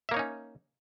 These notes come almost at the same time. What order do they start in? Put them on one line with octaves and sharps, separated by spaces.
E5 A#3 C#5 D#4 C#4